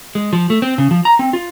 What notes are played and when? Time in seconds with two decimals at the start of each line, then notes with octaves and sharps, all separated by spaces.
0.15 G#3
0.33 F3
0.50 A3
0.62 C4
0.78 C#3
0.91 F3
1.05 A#5
1.19 C4
1.33 F4